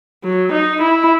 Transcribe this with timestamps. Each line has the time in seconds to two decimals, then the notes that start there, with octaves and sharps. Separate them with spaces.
0.24 F#3
0.52 D#4
0.81 E4